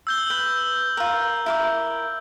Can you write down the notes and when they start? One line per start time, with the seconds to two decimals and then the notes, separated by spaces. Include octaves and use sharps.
0.07 E6 G6 G7
0.30 B4
0.97 F4 A#4
1.46 E4 A#4 D6